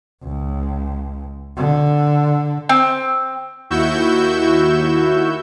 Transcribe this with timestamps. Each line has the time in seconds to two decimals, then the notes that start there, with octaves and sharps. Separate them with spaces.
0.24 C#2
1.57 D3
2.69 C4
3.70 D#2 E4 F#4 C#6 E6 G6